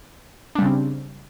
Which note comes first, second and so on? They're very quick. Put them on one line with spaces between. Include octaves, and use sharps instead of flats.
D4 G3 C#3 C4